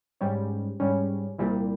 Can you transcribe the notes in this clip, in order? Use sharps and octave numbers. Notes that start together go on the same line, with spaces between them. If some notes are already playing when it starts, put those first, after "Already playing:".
G#2 G3 C#4
G#2 G3 C#4
C2 A#2 G3